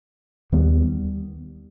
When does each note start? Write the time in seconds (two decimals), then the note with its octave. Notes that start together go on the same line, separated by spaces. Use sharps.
0.52 D#2 D#3 G3 B3